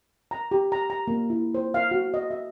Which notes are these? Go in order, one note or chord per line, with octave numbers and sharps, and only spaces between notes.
A#5
G4
A#5
A#5
A#3
E4
C5
F5
F#4
D#5
E5